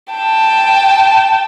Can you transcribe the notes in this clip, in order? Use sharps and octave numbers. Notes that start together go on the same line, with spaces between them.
G5 A5